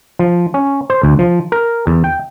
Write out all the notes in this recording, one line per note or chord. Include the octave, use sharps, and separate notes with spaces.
F3
C#4
C5
D2
F3
A#4
E2
G5